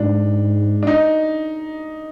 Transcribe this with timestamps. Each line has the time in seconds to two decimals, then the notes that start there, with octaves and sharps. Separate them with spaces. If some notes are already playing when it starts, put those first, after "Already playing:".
Already playing: G#2 D4
0.83 D4
0.87 D#4